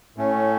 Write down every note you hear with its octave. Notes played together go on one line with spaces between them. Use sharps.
A2 A3 C#4